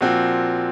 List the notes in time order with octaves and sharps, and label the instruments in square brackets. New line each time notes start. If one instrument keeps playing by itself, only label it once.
[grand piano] A#2 F3 C4 F#4